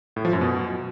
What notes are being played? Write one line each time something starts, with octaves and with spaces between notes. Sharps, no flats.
A2
F3
F#2
B2